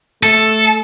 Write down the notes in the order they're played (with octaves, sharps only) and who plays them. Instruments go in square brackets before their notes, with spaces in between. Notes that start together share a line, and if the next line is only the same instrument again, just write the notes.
[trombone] A3 [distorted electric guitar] A4